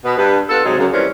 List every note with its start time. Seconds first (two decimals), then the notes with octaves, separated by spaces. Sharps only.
0.04 B2 B3
0.17 G2 B4
0.49 B3 D4 F4 A4
0.65 G#2 C3 F#3 G#3
0.78 F#2 C#3
0.93 E3 F3 G3 A#3 C4 C#4